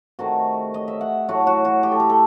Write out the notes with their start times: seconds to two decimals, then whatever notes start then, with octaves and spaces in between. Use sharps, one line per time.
0.19 C3 D#3 A3 F#4
0.74 D#5
0.88 E5
1.01 F#5
1.28 A2 F#3 A3 F#4
1.47 F#4
1.65 F#4
1.83 G4
1.92 A4
2.00 G4
2.10 A4